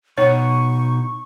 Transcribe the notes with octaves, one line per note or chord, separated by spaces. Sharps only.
B2 D#4 C#5 F#5 C#6